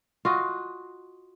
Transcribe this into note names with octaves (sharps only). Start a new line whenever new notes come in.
F4 F#4 D#5